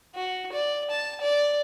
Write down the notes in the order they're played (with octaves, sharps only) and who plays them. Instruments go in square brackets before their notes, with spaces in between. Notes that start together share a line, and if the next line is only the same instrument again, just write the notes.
[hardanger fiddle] F#4
D5
A5
D5